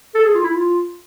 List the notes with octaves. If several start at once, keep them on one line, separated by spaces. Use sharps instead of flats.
A4
G#4
F4
E4
F4